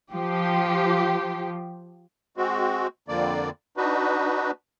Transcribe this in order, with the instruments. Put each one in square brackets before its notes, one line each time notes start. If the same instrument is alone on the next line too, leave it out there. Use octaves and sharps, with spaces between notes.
[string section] F3 G4
[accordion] G#3 C4 F#4
F2 D3 A#3 D5
D4 D#4 F#4 B4